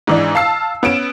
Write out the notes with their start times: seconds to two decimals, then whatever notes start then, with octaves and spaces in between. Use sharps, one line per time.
0.07 G#2 E3 D4
0.35 F5 A5 E6 C7
0.83 B3 C#4 D7 E7